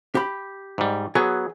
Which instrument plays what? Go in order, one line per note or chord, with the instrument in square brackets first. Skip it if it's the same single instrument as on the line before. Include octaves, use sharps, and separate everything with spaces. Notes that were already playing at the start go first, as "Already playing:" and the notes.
[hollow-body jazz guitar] G4 B5
[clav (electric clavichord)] G#2 G3
[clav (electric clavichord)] F#3 B3 [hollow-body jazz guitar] G#4